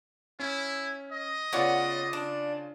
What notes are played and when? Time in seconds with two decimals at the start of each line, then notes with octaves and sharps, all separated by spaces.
0.40 C#4 E4
1.12 D#5
1.53 C#3 B3 F4 C#5 D5 F#5
2.13 D4